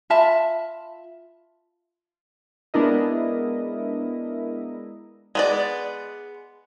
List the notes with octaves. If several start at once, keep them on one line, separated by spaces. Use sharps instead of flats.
F4 E5 A5 B5
G#3 B3 D4 E4 A#4 D#5
G#3 B3 D5